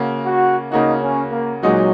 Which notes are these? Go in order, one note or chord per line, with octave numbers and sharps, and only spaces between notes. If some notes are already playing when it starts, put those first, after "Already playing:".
Already playing: C#3 A#3 F#4
F#4
C#3 A#3 D#4 F#4
C#4
A#3
A#2 F#3 G#3 D#4 F#4